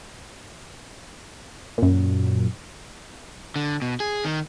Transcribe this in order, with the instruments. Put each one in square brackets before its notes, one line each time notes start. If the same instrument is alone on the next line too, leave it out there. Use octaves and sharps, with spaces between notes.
[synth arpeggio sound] F#2 A#2
[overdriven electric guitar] D3
B2
G#4
D#3